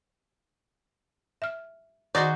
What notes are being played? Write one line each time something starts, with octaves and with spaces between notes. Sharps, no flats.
E5 F6
D#3 D#4 F#4 G#4 C5 D5